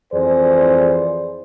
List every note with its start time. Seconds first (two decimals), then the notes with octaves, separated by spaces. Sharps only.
0.12 F2 E3 G#4 C5 D5